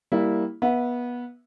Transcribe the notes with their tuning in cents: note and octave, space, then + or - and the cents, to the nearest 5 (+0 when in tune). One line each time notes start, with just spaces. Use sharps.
G3 +0 A#3 +0 E4 -15
B3 -20 E5 +0